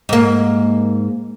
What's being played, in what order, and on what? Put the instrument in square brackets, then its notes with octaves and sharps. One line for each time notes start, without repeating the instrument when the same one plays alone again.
[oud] G#2 A#3